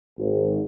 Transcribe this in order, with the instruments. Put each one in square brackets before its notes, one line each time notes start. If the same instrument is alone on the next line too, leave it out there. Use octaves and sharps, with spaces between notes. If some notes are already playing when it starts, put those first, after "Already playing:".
[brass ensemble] G#1